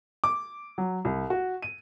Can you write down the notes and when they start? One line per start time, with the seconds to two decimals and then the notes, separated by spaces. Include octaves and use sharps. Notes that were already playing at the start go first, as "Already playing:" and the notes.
0.24 D6
0.78 F#3
1.05 C2
1.30 F#4
1.62 D#7